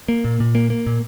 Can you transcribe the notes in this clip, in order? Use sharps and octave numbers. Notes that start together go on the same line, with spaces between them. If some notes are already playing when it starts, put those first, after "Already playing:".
A#3
A#2
A#2
A#3
A#3
A#2